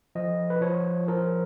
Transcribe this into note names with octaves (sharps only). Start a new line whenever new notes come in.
F3 D#5
B4
F3 C#5
F3 A#4